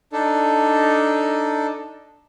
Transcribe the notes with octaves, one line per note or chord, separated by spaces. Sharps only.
D4 D#4 A4